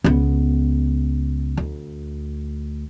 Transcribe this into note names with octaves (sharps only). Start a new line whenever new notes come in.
C#2 B3
D2